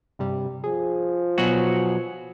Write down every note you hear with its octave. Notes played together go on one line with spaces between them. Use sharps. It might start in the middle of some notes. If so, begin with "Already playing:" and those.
G2 C3 G3
F3 G#4
B2 F#3 F#4 G#5